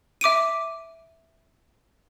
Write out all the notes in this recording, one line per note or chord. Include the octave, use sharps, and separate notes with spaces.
E5 D6 D7 D#7